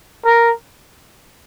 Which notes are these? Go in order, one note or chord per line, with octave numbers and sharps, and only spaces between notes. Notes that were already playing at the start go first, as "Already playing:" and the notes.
A#4